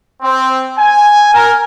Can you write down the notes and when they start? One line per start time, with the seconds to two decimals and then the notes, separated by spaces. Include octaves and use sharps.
0.23 C4
0.79 G#5
1.34 A#4